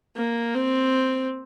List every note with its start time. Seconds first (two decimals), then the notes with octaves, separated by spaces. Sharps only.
0.16 A#3
0.54 C4